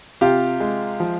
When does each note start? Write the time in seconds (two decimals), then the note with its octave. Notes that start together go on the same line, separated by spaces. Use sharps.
0.21 C3 F4 G4
0.60 G#3
1.00 F3